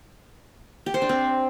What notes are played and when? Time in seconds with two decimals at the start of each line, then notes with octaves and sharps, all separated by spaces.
0.86 G4
0.94 C5
1.02 D4
1.09 C4